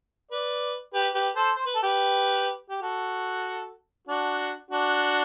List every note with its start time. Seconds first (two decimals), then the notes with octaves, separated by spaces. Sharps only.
0.31 B4 D5
0.94 G4 B4
1.14 G4 B4
1.36 A4 C5
1.56 C5
1.66 B4
1.75 A4
1.83 G4 B4
2.70 G4
2.82 F#4 A4
4.07 D4 F#4
4.71 D4 F#4